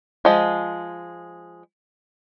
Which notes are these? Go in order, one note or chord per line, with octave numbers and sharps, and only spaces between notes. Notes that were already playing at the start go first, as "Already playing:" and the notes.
F3 G#3